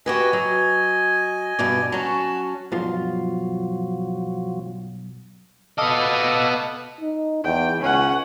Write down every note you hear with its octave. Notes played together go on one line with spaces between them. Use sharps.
F#4 G4 B4 D#5 G#5
F#3
G2 B2 D5
F#3 C#4 F#4 A5
B1 G2 F3 F#3 F4
B3 A4 D#5 F5 A5 D6
D#4
E2 G5
C#2 C#4 F#5